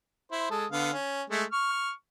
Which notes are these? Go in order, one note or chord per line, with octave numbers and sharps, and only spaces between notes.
E4 C5
G#3 A4 D#6
D3 B3 F5
C#4
G#3 A3
C#6 F6